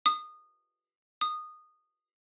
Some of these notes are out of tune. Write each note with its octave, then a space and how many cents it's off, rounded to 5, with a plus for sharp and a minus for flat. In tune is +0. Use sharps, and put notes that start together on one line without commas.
D#6 -20
D#6 -15